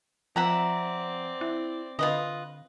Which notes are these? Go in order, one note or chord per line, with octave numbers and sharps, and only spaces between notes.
F3 C4 D5 E5 F#5 A#5
E4
D3 F4 B4 D#5